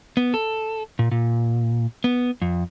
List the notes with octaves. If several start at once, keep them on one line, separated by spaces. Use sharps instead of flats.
B3
A4
A#2
A#2
B3
F2